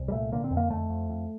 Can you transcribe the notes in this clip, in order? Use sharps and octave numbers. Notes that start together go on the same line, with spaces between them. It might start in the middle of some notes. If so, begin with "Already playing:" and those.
Already playing: C2
G3
A#2 A3
D3 A#3
C4
F2
A#3
F2 A3
F2
F2